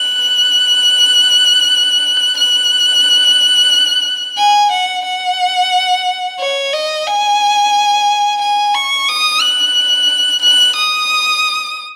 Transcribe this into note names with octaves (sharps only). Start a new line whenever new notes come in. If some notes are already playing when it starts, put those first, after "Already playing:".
Already playing: F#6
F#6
G#5
F#5
F#5
C#5
D#5
G#5
G#5
C#6
D#6
F#6
F#6
D#6